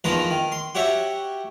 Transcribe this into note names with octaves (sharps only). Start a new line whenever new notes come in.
E2 D#3 F3 B4 A#5 C6
D#3
C6
F#4 G4 C#5 E5 F#5